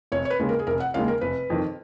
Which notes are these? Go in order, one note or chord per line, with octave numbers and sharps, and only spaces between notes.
F1 C#5
C#5
B4
D#2 C#3 G#3
A#4
G#4
F1 A#4
F#5
D#2 C#3 G#3 F5
A#4
F1 B4
F2 D#3